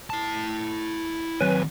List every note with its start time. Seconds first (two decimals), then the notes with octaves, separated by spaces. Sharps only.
0.10 E4 A5
1.41 D#3 F#3 C4 B4 G#5